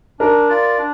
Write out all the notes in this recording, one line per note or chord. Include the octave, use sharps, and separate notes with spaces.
D4 A#4
F4 D5
D4